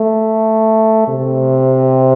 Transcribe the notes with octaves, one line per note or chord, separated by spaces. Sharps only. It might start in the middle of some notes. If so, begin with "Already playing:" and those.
Already playing: A3
C3